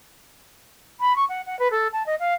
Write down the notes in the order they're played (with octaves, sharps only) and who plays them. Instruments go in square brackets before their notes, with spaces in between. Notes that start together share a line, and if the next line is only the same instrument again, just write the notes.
[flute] B5
C#6
F#5
F#5
B4
A4
A5
D#5
F5